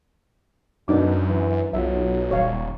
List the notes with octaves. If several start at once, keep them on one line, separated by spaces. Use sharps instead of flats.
F#2 B2 D4 D#4 D6
E3
B1 F#3 F4 E5
D#1 C#5 F5